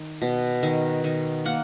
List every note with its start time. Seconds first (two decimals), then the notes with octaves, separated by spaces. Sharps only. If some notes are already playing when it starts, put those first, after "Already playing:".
Already playing: D#3
0.22 B2
0.63 D#3
1.04 D#3
1.45 A#3 F#5